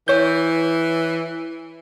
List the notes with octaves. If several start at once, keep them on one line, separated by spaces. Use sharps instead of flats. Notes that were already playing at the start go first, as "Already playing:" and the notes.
E3 C#5 G6